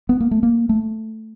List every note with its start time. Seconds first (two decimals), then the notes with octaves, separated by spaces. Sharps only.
0.09 B3
0.20 A#3
0.31 A3
0.43 A#3
0.69 A3